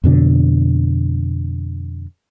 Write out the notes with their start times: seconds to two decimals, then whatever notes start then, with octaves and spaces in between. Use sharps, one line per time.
0.04 F2 B2 D3